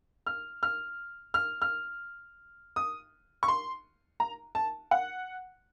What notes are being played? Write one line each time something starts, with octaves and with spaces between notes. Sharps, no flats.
F6
F6
F6
F6
D#6
C#6
C6
A#5
A5
F#5